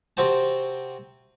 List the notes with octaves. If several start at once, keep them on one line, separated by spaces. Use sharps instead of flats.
C3 C4 F#4 C5 A5